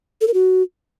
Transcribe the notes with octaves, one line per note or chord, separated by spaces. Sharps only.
A4
A#4
F#4